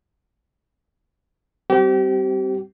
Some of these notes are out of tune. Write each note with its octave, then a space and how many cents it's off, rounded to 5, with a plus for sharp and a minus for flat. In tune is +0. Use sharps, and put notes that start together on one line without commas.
G3 +0 C4 +0 G4 -35